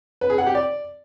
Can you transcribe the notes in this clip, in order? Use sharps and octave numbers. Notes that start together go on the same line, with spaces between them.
B4
G#4
F#5
G4
D5